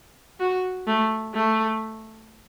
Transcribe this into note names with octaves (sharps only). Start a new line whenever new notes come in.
F#4
A3
A3